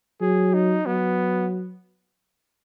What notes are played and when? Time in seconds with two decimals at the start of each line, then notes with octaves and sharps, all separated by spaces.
0.21 F#3 G#4
0.54 D#4
0.86 F#3 B3